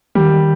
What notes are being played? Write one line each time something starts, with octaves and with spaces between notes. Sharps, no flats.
D#3 G3 G4